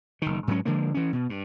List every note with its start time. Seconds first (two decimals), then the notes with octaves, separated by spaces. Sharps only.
0.22 F#1 D#3
0.47 G#2 F#3 C#4
0.65 D3 F3 G#3 A#3
0.94 E3 C#4
1.13 B2
1.30 G2